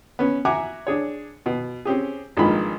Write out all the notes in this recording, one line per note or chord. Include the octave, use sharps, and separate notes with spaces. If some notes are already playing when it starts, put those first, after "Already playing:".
B3 C#4
F#4 E5 F#5 G#5 A#5 D6
D4 G#4 C#5
B2
C4 C#4 G4 G#4
G#1 G2 F3 G#3 A#3 B5